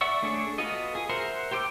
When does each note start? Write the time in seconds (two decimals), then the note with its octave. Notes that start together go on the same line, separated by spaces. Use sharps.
0.01 D5 E5 F#5 C#6 E6
0.22 A3 D4 G#4 A4 C#5
0.58 B3 F4 F#4 A4 D#5
0.95 G#4
1.09 A#4 C5 E5 F#5
1.51 G4 C5 G5 D6 E6